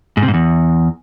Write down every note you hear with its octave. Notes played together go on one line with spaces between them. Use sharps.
G#2
C3
G#2
E2